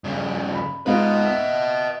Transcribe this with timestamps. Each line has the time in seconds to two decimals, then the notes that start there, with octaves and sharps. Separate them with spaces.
0.04 G2 C#3
0.55 B5
0.86 G#2 B3 F4 B4 D#5
1.25 E5